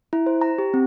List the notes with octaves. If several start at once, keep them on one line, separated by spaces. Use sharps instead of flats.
E4
C5
A#5
G4
C4